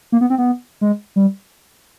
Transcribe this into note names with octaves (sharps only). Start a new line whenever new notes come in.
A#3
B3
C4
B3
G#3
G3